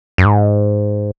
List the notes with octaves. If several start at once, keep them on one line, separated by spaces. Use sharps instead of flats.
F#2
G#2